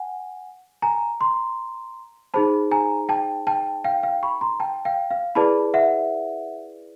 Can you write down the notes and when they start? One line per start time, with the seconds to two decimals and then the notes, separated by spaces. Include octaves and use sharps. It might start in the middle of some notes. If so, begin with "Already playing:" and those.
Already playing: F#5 G#5
0.82 G#5 A#5
1.20 A#5 C6
2.34 D#4 G#4 C5 A5 B5
2.71 G#5 A#5
3.09 G5 A5
3.47 G5 A5
3.84 F5 G5
4.03 F5 G5
4.23 B5 C#6
4.41 A#5 C6
4.60 G5 A5
4.85 F5 G5
5.11 F5
5.35 E4 G#4 B4 D5 A5 B5
5.74 E5 F#5